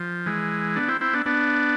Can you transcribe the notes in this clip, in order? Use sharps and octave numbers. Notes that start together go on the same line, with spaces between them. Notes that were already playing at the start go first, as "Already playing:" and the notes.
Already playing: F3
E3 G#3
B3 D4
C4 E4
C4 E4
B3 D4
B3 D4